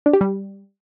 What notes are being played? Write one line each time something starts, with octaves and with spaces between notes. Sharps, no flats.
D4
G4
G3